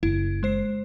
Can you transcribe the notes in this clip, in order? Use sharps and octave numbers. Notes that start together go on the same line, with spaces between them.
F#1 E4
G#3 C5 C7